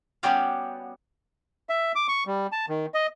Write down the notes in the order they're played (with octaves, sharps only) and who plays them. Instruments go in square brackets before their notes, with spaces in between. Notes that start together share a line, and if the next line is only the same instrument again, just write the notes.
[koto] G3 B3 C#4 F#4 G4 F5
[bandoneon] E5
D6
C#6
G3
A5
D#3
D#5